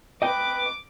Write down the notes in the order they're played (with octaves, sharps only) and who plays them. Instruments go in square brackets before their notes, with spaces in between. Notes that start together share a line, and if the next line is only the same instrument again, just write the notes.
[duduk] B4 [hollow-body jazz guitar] D#5 G5 [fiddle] D6